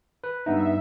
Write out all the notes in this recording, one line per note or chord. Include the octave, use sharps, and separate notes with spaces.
B4
G2 B3 D#4 E5